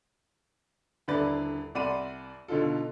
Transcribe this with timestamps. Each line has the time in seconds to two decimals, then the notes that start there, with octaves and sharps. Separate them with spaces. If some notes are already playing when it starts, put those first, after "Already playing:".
1.08 D#1 D3 E4 B4 D5 A6
1.75 C2 D5 F#5 B5 C6 D#7
2.48 B2 D3 D#4 F4 A4